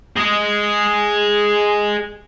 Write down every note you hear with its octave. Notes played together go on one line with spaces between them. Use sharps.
G#4 D#5